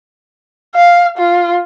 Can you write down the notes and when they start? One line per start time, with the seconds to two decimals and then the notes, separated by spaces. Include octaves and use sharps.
0.74 F5
1.18 F4